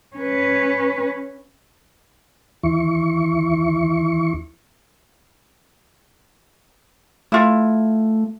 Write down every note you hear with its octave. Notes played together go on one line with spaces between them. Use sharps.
C#4 B4
D#2 E3 E4 C#6
A3 E4 F4